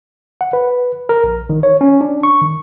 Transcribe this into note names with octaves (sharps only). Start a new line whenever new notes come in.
F#5
B4
A#4
A#1
D#3
C#5
C#4
D4
C#6
D#3